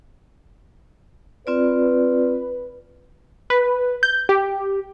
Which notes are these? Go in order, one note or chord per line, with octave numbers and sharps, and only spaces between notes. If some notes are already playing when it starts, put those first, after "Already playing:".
C4 F4 B4 D5
B4
G6
G4